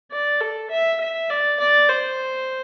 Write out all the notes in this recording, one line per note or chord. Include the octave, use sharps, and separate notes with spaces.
D5
A4
E5
E5
D5
D5
C5